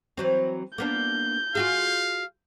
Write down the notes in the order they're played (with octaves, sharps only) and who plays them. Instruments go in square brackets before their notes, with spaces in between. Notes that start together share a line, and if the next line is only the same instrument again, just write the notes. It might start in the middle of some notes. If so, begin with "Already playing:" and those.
[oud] E3 F#3 C4
[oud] A#3 B3 D4 [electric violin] G6
[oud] F4 F#4 G#4 [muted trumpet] F5